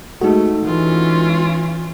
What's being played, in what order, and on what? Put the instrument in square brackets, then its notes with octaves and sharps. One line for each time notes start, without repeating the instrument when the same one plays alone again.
[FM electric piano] G#3 F#4 [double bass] A3 [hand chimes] D#4 A4
[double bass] E3 [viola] C#4 F4